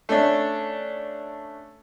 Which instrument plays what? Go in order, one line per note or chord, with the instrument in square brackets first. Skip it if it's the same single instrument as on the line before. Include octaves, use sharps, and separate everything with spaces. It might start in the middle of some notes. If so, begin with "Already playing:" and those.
[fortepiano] A3 C#4 D4